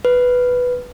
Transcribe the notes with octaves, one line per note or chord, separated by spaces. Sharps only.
B4